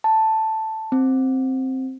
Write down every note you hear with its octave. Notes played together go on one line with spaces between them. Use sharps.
A5
C4